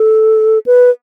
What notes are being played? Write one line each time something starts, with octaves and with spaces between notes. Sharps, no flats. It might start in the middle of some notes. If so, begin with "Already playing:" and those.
Already playing: A4
B4